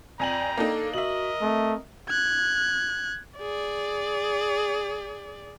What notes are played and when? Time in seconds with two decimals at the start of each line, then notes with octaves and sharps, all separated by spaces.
0.20 F2 D5 G5 G#5 A#5 F#7
0.58 A#3 D4 D#4 A4
0.93 F#4 A#4 D#5 E5 F#7
1.42 A3 C4
2.09 F#6 G#6
3.38 G#4 D5